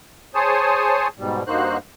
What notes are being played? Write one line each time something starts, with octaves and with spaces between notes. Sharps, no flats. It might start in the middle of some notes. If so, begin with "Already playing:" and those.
G#4 C5 C#5 G#5 A5 D#6
G#2 B2 G3
G2 A#3 D#4 F#4 C5 F#6